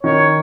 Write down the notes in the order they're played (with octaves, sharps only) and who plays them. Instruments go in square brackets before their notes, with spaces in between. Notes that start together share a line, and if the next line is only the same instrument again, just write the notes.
[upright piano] D#3 [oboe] C#5